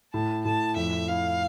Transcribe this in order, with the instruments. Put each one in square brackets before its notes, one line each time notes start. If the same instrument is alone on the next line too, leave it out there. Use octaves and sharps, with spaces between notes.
[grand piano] A2 [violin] A5
[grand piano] A2 [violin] A5
[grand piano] F2 [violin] E5
[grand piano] E4 [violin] F5